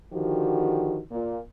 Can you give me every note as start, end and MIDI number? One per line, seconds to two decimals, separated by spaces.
0.13 0.98 50
0.13 0.98 51
0.13 0.98 53
0.13 0.98 66
0.13 0.98 67
1.11 1.39 46